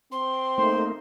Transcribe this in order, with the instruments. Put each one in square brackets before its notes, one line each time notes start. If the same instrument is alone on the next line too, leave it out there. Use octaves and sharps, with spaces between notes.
[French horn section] C4 [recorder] C6
[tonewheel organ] A3 A#3 D#4 [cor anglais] C5